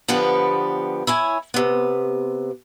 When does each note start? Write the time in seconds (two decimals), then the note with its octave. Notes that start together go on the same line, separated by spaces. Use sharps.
0.08 D3 F3 B3 G4 B4
1.07 E4 C#5 G#5
1.54 C3 B3